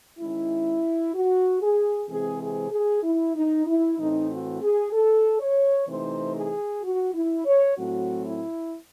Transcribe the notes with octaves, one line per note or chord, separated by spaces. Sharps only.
D#3 G#3 C#4 E4
F#4
G#4
C3 E3 G#3 C4 G#4
G#4
G#4
E4
D#4
E4
A2 E3 A3 C4 D#4
F#4
G#4
A4
C#5
C3 E3 A3 C4 D#4 C5
G#4
F#4
E4
C#5
A2 F#3 A3 C4 F#4
E4